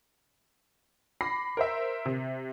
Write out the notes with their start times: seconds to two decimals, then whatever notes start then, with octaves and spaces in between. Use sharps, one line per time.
1.21 B5 D6 A#6 C7
1.57 A#4 C5 E5
2.06 C3